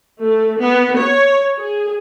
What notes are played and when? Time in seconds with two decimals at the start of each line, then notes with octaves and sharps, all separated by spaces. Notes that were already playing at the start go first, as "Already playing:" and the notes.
0.22 A3
0.62 B3
0.99 C#5
1.58 G#4